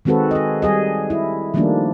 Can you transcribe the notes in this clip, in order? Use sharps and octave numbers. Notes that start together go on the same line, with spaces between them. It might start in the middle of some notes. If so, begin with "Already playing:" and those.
D#3 G#3 C4 F#4 A4 B4
G#4 D#5
G3 G#4 D#5
E4
D#3 F3 G3 A3 A#3 D4